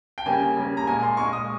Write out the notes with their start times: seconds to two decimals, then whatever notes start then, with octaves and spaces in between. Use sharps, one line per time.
0.18 G5
0.26 C#3 G3 A#3 G#5
0.57 C#3 G3 A#3
0.77 A#5
0.87 A#2 G#3 G#5
1.03 C6
1.17 A#2 G#3 C#6
1.33 D#6